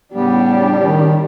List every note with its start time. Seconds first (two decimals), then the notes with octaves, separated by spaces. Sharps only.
0.14 A2 C#3 G3 B3 D4 G4
0.82 D#3